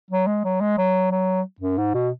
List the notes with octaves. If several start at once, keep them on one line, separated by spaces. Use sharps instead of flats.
F#3
G#3
F#3
G#3
F#3
F#3
F#2
G#2
B2